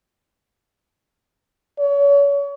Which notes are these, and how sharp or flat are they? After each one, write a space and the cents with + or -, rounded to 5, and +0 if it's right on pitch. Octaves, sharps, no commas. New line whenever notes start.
C#5 +35